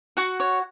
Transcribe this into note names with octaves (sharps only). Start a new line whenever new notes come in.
F#4 F#5
C#5